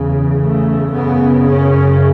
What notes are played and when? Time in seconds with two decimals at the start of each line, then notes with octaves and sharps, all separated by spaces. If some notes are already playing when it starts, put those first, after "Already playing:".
Already playing: E2 C#3
0.41 A3
0.93 F#2 C#3 B3
1.47 C#4